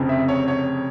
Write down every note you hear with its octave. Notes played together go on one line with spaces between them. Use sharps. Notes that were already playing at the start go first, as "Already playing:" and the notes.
Already playing: F1 F2 C#3
E5
C#5
C#5